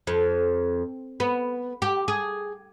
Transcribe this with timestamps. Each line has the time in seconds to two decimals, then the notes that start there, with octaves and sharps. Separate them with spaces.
0.07 F2
1.20 B3
1.82 G4
2.08 G#4